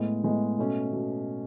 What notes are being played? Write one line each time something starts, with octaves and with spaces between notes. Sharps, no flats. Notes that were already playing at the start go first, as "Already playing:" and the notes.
Already playing: A2 G#3 B3
A2 G#3 B3
B2 A3 C#4
B2